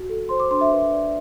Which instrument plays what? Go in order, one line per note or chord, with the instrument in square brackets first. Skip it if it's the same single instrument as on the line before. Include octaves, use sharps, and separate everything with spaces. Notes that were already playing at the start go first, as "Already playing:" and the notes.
Already playing: [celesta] F#4
A4
C5 C6
D6
D4 C6
E5
B4
D5